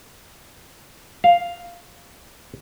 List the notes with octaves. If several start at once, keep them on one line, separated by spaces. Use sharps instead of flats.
F5